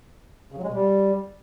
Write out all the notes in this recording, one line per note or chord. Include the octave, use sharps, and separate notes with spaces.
C#3
F#3
G#3
B2
G3